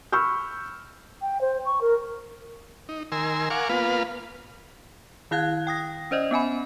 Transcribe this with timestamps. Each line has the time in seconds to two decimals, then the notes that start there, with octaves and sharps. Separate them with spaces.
0.12 B5 C#6 E6 F6 G6
1.21 G5
1.41 C5
1.65 C#6
1.81 A#4
2.89 D#4
3.12 D#3 A#4 G#5 C6 E6
3.50 A#4 F5 F#5 G#5 C#6 D6
3.69 A#3 B3 F4 B4 F5
5.31 D#3 E4 F5 F#6 G#6
5.67 G5 D#6 A#6
6.11 C#4 C5 D5 D#5
6.31 B3 C#4 G#5 B5